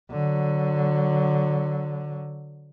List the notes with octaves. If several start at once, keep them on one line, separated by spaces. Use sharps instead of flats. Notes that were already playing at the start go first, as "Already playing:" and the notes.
D3 F#3